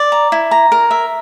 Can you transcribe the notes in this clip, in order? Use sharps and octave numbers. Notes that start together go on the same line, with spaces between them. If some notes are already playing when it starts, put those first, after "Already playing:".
Already playing: D5
A#5
E4
A#5
A#4
E5